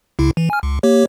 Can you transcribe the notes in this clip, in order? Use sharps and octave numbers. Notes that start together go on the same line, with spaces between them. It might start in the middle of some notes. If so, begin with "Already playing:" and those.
C#2 C#3 E4
E3
G#5 F6
C#2
A#3 G4 C#5